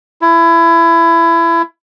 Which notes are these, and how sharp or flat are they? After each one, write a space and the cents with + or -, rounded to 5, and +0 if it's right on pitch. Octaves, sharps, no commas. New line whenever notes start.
E4 +25